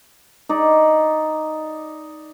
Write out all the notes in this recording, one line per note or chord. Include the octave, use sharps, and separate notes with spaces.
D#4 D5